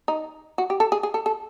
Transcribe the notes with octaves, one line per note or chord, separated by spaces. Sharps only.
D#4
F#4
G4
A4
G#4
G#4
A4
A4